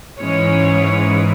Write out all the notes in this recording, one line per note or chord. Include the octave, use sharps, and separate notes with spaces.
G#2 E3 G#3 C#4 C#5